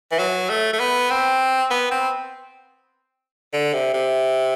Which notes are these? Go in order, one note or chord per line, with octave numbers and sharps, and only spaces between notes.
E3
F#3
A3
A3
B3
C4
B3
C4
D3
C3
C3